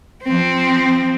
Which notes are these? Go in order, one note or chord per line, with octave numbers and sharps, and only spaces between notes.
F3 C4